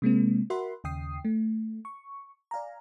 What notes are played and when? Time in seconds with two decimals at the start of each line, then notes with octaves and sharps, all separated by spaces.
0.02 C3 G#3 A#3 C4
0.50 F#4 A#4 E5 F#5 B5 C6
0.84 D#2 C#3 G5 D#6 C7
1.25 A3
1.85 C#6
2.51 D5 F5 G#5 A#5